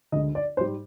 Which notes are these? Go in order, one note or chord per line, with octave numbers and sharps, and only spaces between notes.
D2 D3 G#3 D#5
D5
G#2 G3 C5